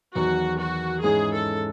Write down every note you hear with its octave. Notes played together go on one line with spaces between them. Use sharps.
E2 D#3 F#3 F#4
F#4
G#2 E3 G#3 C#4 G#4
A4